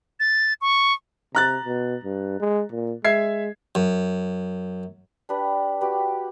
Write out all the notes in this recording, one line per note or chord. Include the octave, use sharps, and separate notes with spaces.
A6
C#6
C3 A#5 F#6 A6
B2
G2
G#3
A#2
G#3 E5 G#6 C7
F#2
D4 G4 B4
F#4 G4 B4